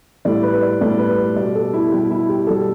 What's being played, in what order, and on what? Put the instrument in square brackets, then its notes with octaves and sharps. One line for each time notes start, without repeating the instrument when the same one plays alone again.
[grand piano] A2 G3 D5
B4
D5
A2 G3 D5
B4
B2 G3 D5
A4
E4
B2 G3 G4
E4
G4
B2 G3 A4